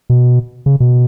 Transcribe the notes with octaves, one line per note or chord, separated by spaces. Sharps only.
B2
C#3
B2